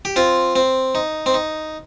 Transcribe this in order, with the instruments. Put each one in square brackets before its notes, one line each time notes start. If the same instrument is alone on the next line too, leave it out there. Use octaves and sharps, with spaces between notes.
[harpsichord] G4
C4 F4
C4
D#4
C4
D#4